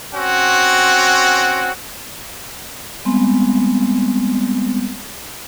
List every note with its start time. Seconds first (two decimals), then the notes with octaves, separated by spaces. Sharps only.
0.15 C4 C#4 F#4
3.05 G3 G#3 B3 C4 C6